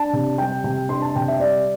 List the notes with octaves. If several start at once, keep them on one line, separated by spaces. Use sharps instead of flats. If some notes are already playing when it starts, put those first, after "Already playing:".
Already playing: D4 A5
C3
G3 G5
C3 G5
D4 C6
A5
C3 G5
E5
G3 D5